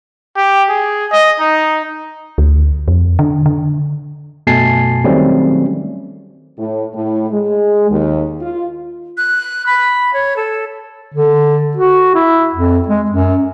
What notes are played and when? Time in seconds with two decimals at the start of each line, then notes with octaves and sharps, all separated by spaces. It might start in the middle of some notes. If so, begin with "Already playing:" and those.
0.36 G4
0.69 G#4
1.12 D#5
1.40 D#4
2.38 D2
2.88 F2
3.19 D3
3.46 D3
4.47 F#2 B2 A3 G#5 A5 C7
5.04 D#3 F#3 G3 A3 C4 C#4
6.58 A2
6.94 A2
7.31 G#3
7.90 D#2
8.40 F4
9.17 F#6
9.66 B5
10.13 C#5
10.36 A4
11.14 D3
11.77 F#4
12.15 E4
12.55 F2
12.88 G#3
13.10 F#2